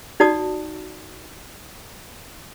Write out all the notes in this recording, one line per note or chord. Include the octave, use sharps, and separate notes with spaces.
D#4 F#4 D5 A5 D#6